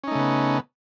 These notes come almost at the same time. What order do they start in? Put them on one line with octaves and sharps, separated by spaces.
C#4 D#4 A3 C#3 B3